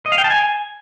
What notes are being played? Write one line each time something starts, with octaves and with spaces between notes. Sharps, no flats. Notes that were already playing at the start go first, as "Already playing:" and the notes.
D#5
F5
G5
A5
G#5